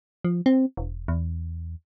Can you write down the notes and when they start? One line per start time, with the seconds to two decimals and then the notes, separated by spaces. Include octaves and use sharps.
0.24 F3
0.46 C4
0.77 E1
1.08 E2